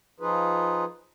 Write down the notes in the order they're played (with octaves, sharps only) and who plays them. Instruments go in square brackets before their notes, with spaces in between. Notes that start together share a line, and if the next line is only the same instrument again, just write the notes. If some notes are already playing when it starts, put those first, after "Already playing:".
[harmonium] F3 D#4 F4 G#4 B4